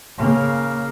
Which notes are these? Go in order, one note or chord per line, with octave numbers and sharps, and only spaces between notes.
C#3 A#3